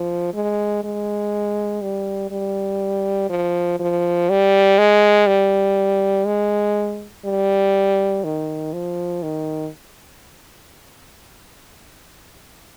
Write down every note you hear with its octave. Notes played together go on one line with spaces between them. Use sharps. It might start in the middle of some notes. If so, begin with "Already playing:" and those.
Already playing: F3
G#3
G#3
G3
G3
F3
F3
G3
G#3
G3
G#3
G3
D#3
F3
D#3